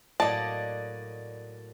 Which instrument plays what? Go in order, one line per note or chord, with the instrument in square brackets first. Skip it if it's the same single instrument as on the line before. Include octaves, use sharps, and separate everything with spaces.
[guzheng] A2 F#3 A#3 [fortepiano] D5 D#5 [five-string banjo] A5